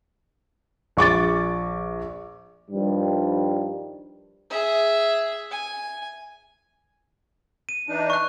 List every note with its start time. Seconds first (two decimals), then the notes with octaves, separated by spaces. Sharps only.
0.97 A#1 C#6 D6 A6
2.71 G2 D#3 F3 G3
4.50 G#4 E5
5.51 G#5
7.69 D#7
7.88 E3 D4 D#4
8.10 C#6 F#6